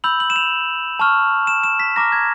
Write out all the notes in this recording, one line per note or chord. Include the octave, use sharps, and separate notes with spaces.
B5 E6 G6 F#7
F#7
E7
F7
A5 C#6 F6
E7
E7
B6
A#5 D6 F6 A#6
G#6